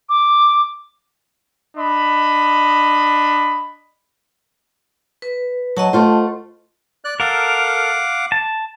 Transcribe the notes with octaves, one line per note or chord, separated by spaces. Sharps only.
D6
D4 D#5 B5
B4
F#3 D#5 F#5 A5
A3 F4 C5
D5 F#6
A4 A#4 F5 F#5 D6
A5